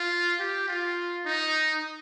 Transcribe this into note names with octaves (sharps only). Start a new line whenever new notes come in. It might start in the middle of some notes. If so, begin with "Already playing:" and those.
Already playing: F4
G4
F4
D#4